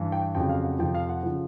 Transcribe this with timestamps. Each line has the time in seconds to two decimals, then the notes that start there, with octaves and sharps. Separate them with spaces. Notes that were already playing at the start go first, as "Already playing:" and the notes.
Already playing: G2 E3
0.12 G5
0.35 F2 C#3 F#3 G5
0.49 F5
0.64 F#5
0.79 F2 C3 F3 G5
0.94 F5
1.09 F#5
1.23 C#3 F3